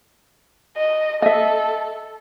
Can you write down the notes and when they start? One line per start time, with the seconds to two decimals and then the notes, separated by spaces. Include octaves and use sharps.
0.77 D#5
1.22 A4 D#5 E5